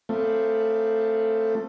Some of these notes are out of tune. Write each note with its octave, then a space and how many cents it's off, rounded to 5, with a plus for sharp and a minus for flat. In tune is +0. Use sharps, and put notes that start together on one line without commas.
A3 +15 C4 +0 F4 +0